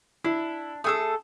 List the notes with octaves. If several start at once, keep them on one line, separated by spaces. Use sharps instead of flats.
D4 E4
A3 G#4 A4 D#6 E6